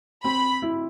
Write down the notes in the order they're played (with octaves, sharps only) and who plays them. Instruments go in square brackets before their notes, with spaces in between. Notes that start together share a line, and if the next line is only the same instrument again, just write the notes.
[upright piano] C4 [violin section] B5
[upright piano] E4